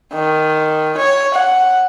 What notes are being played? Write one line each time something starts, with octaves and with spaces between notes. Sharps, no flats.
D#3
C#5
F#5